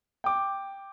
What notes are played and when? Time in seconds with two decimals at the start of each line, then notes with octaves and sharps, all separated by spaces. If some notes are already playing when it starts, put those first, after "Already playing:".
0.24 G5 D6